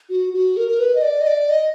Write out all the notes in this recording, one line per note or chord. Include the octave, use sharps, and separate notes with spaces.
F#4
F#4
A#4
A#4
B4
D#5
D5
D#5
D5
D#5